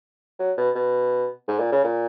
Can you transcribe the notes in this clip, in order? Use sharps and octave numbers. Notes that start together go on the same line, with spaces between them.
F#3
B2
B2
G#2
A#2
C#3
A#2